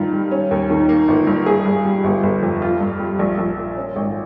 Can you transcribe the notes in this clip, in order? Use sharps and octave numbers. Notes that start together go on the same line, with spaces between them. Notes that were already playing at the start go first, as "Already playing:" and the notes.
Already playing: G2 D#3 F4
G3
C#4
D#2
D#3
A#3
G1
G2
G#4
G2
G3
G1
G1
F2
F4
G2
G3
A#1
A#1
A#2
C#4
G#1